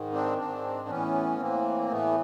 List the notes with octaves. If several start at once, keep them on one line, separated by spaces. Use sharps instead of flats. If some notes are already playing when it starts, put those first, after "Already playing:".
Already playing: G#2 D#3
C4 D4
G#2 D#3 C4 D4
A2 E3 B3 C#4
A2 E3 A#3 C4
A2 E3 A3 B3